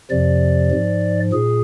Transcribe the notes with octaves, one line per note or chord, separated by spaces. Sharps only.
F2 C3 F3 D5
G#2 F3
A#2 G#4